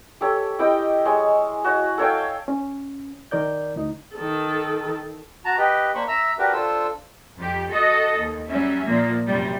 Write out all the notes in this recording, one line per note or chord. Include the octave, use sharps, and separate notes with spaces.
G4 A4 C#5
E4 G4 D#5 G5
G#3 C#5
F#4 C#5
A4 C#5 F5 G5
C#4
D#3 A#4 D5 G6
D2 D#4
D#3 A4
F#4 A5 A#5
G4 B4 D#5
A#3 D4 C5 B5 C#6
E5 A#5 E6
D4 F#4 G4 A#4 B4
D4 F4 A4 C5 E6
F2 G4
F#4 A4 D#5
D#2
F#3 G3 C#4 E5
A#2 F3 A#3
F#2 C3 G3